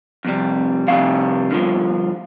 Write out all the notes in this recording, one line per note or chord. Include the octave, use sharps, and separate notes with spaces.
F2 C3 G3
F2 C3 G3 F5
G2 D3 F3